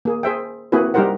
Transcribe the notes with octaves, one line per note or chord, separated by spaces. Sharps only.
A#3 G#4
G#4 C5 E5 G5
A#3 C4 E4 F#4 G#4 B4
G3 D#4 G4 A#4 C5 F#5